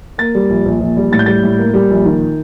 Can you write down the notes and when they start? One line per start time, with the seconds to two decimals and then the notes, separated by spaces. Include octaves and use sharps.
0.18 A#3 A6
0.35 G3
0.50 A#1
0.66 A#1
0.80 A#1
0.97 G3
1.12 A2 A6
1.19 G6
1.26 G3 A6
1.43 A2
1.59 A#3
1.74 G3
1.90 A#1
2.05 D#3